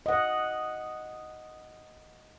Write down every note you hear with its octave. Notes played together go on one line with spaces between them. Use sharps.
D#5 F#5